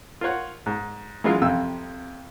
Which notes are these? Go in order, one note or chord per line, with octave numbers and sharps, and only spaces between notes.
F4 A#4 C5 C#5 F#5
G#2
E3 F#3 G#3 C#4 F4
F2 C3 E6